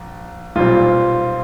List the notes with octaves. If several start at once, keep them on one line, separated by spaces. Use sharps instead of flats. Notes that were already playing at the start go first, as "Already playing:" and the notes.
Already playing: A#1
B1 A#2 G3 C4 F4